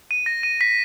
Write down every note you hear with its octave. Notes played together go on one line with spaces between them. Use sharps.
D#7
A#6
D#7
B6